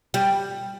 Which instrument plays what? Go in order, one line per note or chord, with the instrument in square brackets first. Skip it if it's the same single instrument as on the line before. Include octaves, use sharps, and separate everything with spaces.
[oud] G3